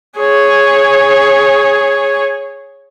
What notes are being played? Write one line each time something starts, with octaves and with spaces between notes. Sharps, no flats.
G#4 C#5